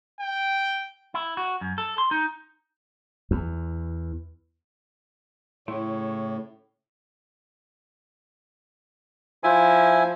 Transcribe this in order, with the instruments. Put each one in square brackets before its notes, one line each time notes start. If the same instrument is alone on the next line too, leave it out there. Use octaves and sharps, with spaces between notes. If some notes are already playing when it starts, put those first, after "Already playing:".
[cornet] G5
[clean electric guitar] E4
F#4
F#2
A4
C6
D#4
[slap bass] E2
[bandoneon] A2 [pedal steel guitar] C#3 A3 [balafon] E4 [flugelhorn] C#5
[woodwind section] F3 [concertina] E4 E5 G#5